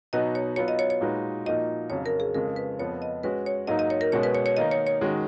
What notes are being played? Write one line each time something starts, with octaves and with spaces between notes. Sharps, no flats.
B2 F#3 B3 D#4 F#4 D#5
C#5
F#3 B3 F4 C#5
D#5
C#5
C#5
A#2 G#3 D#4 F#4 B4
A#2 F3 A#3 D#4 F#4 D#5
F2 C#3 F#3 C#4 C#5
A#4
G#4
F2 C#3 G#3 A#4
B4
F2 F3 B3 C#5
D#5
G#3 C#4 F#4 B4
C#5
G#2 F#3 A#3 D#4 D#5
D#5
C#5
A#4
B2 G#3 C#4 F#4 C#5
B4
C#5
C#5
D#3 A#3 D#4 D#5
C#5
C#5
D#3 G#3 C#4 F#4